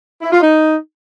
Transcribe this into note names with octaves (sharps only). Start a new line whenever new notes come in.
E4
F4
D#4